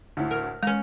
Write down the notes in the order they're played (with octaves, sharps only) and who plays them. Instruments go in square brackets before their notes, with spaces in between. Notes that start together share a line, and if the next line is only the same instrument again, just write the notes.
[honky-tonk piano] D2 A2
[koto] A#4
[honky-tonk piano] F6
[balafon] G#3 [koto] C#4 A#5